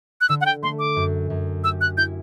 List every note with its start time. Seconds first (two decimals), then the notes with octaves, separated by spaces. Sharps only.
0.21 F#6
0.29 D3 E6
0.41 F#5
0.46 G5
0.63 A3 C6
0.79 D6
0.96 F#2
1.30 F#2
1.64 G4 E6
1.81 F#6
1.97 E4 G6